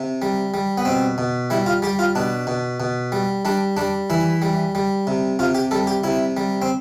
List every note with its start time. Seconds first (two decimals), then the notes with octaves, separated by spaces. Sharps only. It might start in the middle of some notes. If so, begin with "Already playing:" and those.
Already playing: C3
0.22 G3
0.54 G3
0.78 B3
0.85 B2 C4
1.18 B2
1.50 G3 E4
1.66 F4
1.82 G3 G4
1.99 F4
2.15 B2 D4
2.47 B2
2.80 B2
3.12 G3
3.45 G3 D4
3.77 G3 D4
4.10 E3 E4
4.42 G3
4.75 G3
5.07 C3
5.39 C3 F4
5.55 G4
5.71 G3 A4
5.87 G4
6.04 C3 E4
6.37 G3
6.62 C4